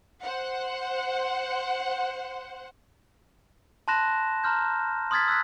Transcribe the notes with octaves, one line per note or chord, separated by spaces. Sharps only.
C5 F#5
A5 B5 C6 F#6 A#6 E7
A#5 C6 F6 G6
C6 D#6 F6 G#6 A6 B6
E6 F#6 G#6 B6